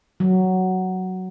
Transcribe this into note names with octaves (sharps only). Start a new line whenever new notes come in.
F#3